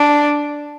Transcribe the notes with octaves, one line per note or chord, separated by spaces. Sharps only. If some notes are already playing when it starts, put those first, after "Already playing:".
Already playing: D4